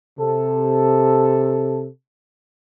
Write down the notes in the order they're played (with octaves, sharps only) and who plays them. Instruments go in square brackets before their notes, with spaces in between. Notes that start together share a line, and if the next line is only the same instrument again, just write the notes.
[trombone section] C3 A4